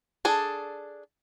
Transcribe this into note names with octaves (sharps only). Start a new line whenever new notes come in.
D4 G#4 A4